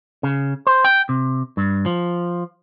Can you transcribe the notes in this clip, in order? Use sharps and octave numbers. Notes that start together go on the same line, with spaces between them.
C#3
C5
G5
C3
G2
F3